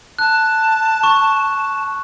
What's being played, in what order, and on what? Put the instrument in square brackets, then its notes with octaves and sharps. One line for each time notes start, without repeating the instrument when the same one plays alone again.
[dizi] A5 [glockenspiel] F#6
[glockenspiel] C#6